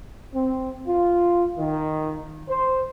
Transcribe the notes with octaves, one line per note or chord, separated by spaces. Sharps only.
C4
F4
D#3
C5